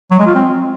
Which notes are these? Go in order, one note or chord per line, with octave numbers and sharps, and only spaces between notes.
F#3
G#3
F4
C4